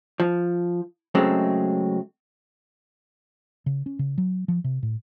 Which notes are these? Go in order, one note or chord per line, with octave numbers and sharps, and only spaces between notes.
F3
C#3 F#3 G#3 A3 C4
C#3
C#4
C#3
F#3
F3
C3
A2